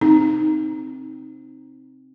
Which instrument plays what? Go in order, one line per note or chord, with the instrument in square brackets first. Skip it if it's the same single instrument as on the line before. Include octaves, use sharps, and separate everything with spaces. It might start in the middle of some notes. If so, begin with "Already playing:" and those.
[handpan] C4 [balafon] D#4